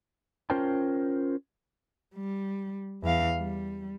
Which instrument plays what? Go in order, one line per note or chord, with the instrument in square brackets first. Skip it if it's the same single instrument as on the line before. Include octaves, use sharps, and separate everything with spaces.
[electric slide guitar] C#4 F4 A#4 C5 G5 A5
[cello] G3
E2 F5
G3